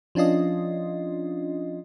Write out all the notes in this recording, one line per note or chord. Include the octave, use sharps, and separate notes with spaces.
F3 C#4 D4 F4 D#5